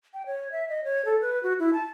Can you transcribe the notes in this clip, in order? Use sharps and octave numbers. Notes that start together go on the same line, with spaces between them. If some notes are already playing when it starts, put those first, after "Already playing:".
G5
C#5
E5
D#5
C#5
A4
B4
F#4
E4
A5